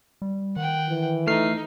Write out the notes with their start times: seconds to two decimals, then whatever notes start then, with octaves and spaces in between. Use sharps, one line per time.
0.22 G3
0.56 D#3 F#5 G5
0.89 E3
1.27 A3 D#4 F6 C7